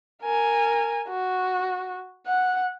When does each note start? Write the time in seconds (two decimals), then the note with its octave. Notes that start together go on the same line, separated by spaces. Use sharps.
0.23 A#4 G#5
1.09 F#4
2.26 F#5